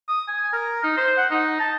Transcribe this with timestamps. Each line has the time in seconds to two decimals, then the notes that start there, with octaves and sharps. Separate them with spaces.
0.08 D#6
0.28 G#5
0.53 A#4
0.84 D#4
0.97 C5
1.17 F#5
1.31 D#4
1.60 A5